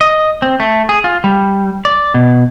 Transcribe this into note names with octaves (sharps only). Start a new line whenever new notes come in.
D#5
C4
A3
G#4
F4
G3
D5
B2